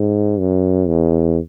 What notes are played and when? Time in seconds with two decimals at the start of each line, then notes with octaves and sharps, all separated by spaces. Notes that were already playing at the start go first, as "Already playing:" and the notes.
Already playing: G#2
0.39 F#2
0.88 E2